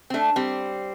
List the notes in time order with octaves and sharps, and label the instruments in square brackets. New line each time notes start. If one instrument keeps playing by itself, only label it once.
[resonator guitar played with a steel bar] C4
A3 D4
G3 C4